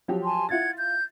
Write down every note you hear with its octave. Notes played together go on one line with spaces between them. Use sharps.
F3 F#3 G4
G#5 A5 C6
E4 F4 F#5 G#6 A6
G6